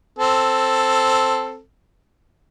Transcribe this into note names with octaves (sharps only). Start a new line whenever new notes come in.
C4 A4